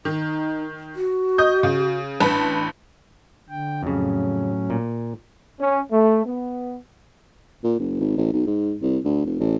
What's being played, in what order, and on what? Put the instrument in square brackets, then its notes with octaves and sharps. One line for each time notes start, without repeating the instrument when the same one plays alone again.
[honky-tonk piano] D#3 [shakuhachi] D#4
[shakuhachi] F#4
[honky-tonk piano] D#5 D#6 G6
C#3
[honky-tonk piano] A1 B4 A5 [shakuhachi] D4
[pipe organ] D3 G5
[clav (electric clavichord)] F2 C#3 [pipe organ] A2 F#3 C#4
[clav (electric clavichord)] A#2
[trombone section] C#4
A3
B3
[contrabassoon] A#2
F#1
G#1
A1
B1
G#2
C2
D2
F1
A1